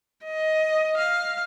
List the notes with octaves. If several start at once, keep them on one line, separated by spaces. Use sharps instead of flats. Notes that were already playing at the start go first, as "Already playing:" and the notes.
D#5
F5